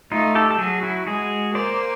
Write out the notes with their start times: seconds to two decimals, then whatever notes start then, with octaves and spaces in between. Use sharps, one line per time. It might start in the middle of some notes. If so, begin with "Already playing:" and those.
0.12 A3 D#4 F4
0.35 G4 A4
0.51 A4
0.59 F#3 F#4 G#4
0.83 E4 F#4
1.07 G#3 F#4 G#4
1.54 A#3 C5 D5